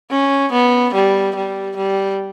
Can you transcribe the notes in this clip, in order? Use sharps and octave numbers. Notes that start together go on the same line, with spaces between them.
C#4
B3
G3
G3
G3